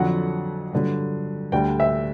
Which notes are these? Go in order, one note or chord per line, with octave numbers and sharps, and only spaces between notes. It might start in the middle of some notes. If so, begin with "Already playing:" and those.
Already playing: F2 D3 F#3 F#5
G2 D3 F#3
D2 D3 G3 G5
E5